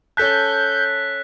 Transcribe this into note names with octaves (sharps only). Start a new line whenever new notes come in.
C#4 A4 A5 F#6 G6 B6